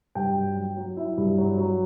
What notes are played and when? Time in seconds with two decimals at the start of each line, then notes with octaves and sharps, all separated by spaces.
0.15 G2 G5
0.35 F#3
0.56 F#3
0.77 F#3
0.97 E4
1.17 G2
1.38 F#3
1.58 F#3